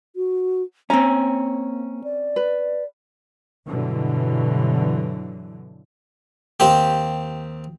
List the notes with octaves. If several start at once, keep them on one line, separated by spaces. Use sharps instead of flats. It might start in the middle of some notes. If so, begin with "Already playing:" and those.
F#4
A#3 C4 C#4 A#5
D5
B4
G2 B2 D3 E3 F#3
D#2 C4 G4